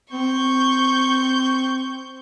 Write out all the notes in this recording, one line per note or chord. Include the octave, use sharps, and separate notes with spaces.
C4 C#6 G6